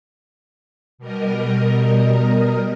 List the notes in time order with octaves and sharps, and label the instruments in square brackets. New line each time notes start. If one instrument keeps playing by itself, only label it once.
[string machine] B2 G3 A#4 D#5